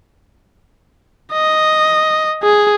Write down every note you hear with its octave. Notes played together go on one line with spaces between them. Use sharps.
D#5
G#4